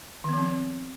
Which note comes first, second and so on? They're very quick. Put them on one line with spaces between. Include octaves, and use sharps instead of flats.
D#3 B3 F3 C4